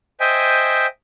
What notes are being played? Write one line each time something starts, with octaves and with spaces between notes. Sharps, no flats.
C5 D#5 E5 G5 G#5